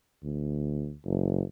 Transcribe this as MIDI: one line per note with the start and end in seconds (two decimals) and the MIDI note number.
0.23 0.92 38
1.06 1.42 30